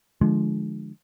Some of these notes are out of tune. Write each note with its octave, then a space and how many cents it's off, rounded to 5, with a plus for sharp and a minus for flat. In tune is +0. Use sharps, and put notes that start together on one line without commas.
D3 +25 F3 +0 G#3 +20